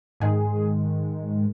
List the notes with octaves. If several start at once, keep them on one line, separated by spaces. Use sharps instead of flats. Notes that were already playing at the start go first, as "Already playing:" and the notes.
G#2 D#3 G#3 G#4